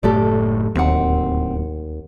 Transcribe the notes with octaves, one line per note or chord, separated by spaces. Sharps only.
F#1 A2 A3 G4 A4 D5
D1 D#2 C4 F#5